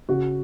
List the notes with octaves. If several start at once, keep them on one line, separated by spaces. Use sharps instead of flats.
C#3 F#4